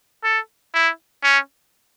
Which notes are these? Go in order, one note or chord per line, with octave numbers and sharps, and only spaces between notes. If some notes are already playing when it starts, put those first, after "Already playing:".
A4
E4
C#4